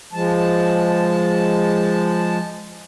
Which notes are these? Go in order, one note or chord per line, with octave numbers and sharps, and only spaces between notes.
F3 G#3 A5